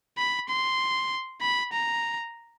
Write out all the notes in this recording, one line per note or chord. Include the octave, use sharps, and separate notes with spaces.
B5
C6
B5
A#5